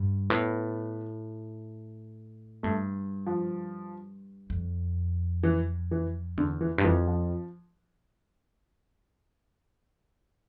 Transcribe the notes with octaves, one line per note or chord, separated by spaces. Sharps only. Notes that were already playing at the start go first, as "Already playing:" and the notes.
Already playing: G2
A2 B3
G2 A3
F3
F2
E3
E3
E2 D3
E3
G2
F2 E3
F3